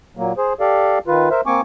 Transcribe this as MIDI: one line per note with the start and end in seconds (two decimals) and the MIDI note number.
0.17 0.33 46
0.17 0.33 54
0.17 0.33 58
0.38 0.53 68
0.38 0.53 72
0.60 0.99 67
0.60 0.99 69
0.60 0.99 74
0.60 0.99 77
1.07 1.29 51
1.07 1.29 65
1.07 1.29 71
1.31 1.41 70
1.31 1.41 72
1.31 1.41 76
1.46 1.61 58
1.46 1.61 60
1.46 1.61 80
1.46 1.61 85
1.46 1.61 86